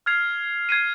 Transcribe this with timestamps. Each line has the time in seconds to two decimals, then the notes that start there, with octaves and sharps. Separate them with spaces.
0.06 F6 G#6 C7 F7
0.69 G#6 C7 D#7